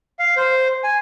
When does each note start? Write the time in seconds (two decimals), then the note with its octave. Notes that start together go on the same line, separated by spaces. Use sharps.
0.19 F5
0.37 C5
0.84 G#5